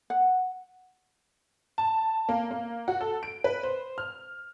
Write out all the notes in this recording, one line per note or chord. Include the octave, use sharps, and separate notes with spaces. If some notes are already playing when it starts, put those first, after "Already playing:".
F#5
A5
A#3
A#3
F#4
A4
D7
B4
C5
F6